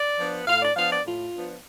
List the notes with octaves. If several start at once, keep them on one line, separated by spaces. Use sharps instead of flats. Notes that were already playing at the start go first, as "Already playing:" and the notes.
Already playing: D5
F3 B3 D4
A2 F5
D5
F3 B3 D4 F5
D5
A2 F4
F3 B3 D4